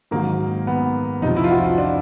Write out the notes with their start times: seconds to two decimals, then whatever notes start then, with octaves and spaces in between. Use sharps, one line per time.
0.11 G#2 D#3 F#3 A#3
0.67 B3
1.22 F2 C3 F3 D#4
1.36 E4
1.44 F4
1.50 F#4
1.64 F4
1.78 D4